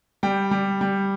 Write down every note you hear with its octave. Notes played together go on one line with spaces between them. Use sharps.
G3 G5
G3
G3